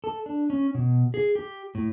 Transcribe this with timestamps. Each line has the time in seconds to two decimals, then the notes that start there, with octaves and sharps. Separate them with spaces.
0.04 A4
0.26 D4
0.50 C#4
0.75 B2
1.14 G#4
1.35 G4
1.75 A2